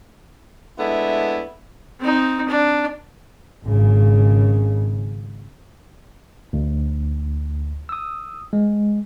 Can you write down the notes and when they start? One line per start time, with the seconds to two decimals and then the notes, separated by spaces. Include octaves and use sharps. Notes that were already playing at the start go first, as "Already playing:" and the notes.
0.79 G#3 A3 B3 D4 E4
2.00 C4 D#4
2.48 D4
3.66 G#1 C#3
6.53 D2
7.89 D#6 E6
8.53 G#3